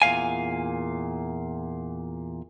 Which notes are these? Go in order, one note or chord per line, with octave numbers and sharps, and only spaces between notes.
E2 A#2 F5 G#5